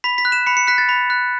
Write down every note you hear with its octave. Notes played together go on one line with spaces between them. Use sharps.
B5 B6
B6
F#6
E7
B5 C#7
C#7
F#6 B6
A6
B5
F#6